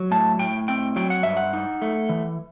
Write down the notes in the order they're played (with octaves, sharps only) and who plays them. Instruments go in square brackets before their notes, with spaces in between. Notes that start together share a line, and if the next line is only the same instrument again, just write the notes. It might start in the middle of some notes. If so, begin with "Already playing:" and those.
Already playing: [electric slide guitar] F#3
A2 A5
A2 G5
C4 G5
F#3 G5
F#5
G2 E5
F#5
D#4
A3
E3